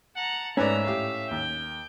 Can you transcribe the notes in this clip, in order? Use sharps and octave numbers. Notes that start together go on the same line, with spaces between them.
F#5 A5 A#5
G#2 A3 C#4 B4 D5 E5 A#5
A2 G4 F5
D#2 G5